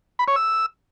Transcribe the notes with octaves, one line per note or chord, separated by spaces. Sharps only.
B5
C#5
E6